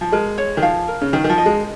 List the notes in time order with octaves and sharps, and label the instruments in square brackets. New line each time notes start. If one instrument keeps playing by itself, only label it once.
[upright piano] F3
[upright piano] G#3 [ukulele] A#4
[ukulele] C#5
[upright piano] D#3
[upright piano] F3 [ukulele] F5
[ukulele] A#4
[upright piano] C#3
[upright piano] D#3 [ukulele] A#4
[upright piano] D#3
F3
[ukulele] D#5
[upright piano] G#3